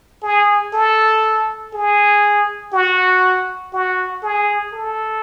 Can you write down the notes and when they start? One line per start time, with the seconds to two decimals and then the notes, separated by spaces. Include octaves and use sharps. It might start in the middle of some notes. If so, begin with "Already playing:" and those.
0.23 G#4
0.73 A4
1.74 G#4
2.73 F#4
3.73 F#4
4.23 G#4
4.73 A4